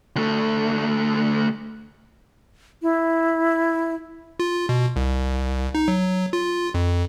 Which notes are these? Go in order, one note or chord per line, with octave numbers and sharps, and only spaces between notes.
D2 A3
E4
F4
B2
C2
D#4
F#3
F4
F2